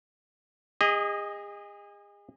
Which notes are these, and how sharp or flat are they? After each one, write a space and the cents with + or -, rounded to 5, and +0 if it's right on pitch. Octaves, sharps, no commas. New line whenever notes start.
G#4 -35 D#5 +0